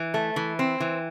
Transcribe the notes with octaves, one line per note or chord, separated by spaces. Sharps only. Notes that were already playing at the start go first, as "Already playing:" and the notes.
Already playing: E3
A3
E3
C4
E3